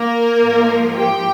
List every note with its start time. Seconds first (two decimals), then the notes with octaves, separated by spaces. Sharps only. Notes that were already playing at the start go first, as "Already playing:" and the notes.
Already playing: A#3 A#4
0.43 G#2 F3
0.96 G4 G5